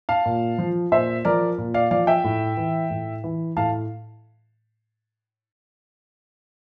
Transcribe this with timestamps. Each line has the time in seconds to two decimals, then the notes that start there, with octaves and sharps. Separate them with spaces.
0.09 F5 A5
0.26 A#2
0.58 F3
0.92 A#2 C5 E5
1.25 F3 A#4 D5
1.58 A#2
1.74 D5 F5
1.91 F3 D5 F5
2.07 E5 G5
2.24 A2
2.57 E3
2.90 A2
3.24 E3
3.57 A2 F5 A5